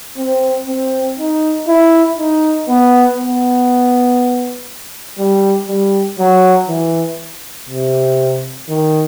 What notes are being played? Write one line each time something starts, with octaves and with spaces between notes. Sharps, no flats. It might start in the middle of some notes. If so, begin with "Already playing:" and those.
C4
C4
D#4
E4
D#4
B3
B3
G3
G3
F#3
E3
C3
D#3